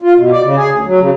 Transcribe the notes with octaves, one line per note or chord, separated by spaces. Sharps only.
F4
B2
D5
C#3
G#4
D2
F#3
C#3